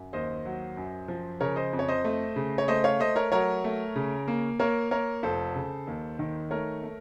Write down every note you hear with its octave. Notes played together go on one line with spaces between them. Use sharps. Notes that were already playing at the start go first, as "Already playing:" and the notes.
Already playing: F#2
D#2 C5 D#5
F#3
F#2
F3
C#3 A#4 C#5
C5 D#5
F2
C#5
C5 D#5
A3
C#3
C#5
A3 C5 D#5
C#5 F5
A3 C5 D#5
A#4 C#5
F#3 A#4 C#5
A3
C#3
A#3
A#3 A#4 C#5
A#3 A#4 C#5
F1 A4 C5
C#3
D#2
D#3
A3 A#4 C#5
A3